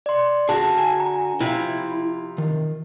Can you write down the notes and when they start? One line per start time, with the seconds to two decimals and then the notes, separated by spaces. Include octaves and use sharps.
0.06 D5 C6
0.49 D3 F#4 G#4 A5
0.78 G#5
1.00 A#5
1.40 C3 F3 E4
2.38 D#3